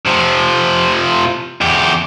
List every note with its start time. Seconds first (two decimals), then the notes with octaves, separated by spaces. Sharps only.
0.05 C3 F3
1.61 E2 G4